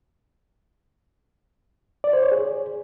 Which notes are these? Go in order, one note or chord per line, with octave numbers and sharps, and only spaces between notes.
D5
C5
C#5
G#4